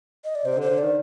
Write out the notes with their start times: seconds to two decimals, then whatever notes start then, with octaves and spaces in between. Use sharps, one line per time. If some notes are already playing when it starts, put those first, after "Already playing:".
0.24 D#5
0.35 D5
0.45 C3 C5
0.58 D3
0.62 C5
0.69 D3
0.78 D#3 D5